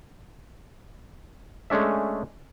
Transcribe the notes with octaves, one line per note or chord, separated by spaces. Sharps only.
G#3 A3 C#4 D4 E5